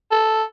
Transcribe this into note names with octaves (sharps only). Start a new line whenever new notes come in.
A4